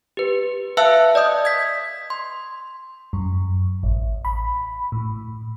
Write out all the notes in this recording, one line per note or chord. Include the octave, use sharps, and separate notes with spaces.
G4 B4
B4 E5 F5 A5 E6 F#6
D5 D#5 D#6 G6
G#6 B6
C6
F#2
A1
B5
A2